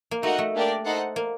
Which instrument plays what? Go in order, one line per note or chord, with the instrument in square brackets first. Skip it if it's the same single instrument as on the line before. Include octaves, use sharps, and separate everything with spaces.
[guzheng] A#3
[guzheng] A3 [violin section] D#4 F#4 A#4 D#5 F#5
[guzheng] A3
[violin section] A#3 D4 G4 A#4 D5
D#4 A4 C5 F#5
[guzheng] A#3